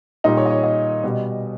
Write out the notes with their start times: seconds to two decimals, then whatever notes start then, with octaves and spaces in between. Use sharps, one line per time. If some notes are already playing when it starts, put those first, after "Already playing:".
0.24 A#2 G3 D#4
0.37 C#5
0.46 D#5
0.50 C#5
0.64 D#5
1.04 B2 G3